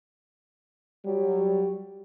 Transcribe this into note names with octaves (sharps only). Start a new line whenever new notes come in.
F#3 G3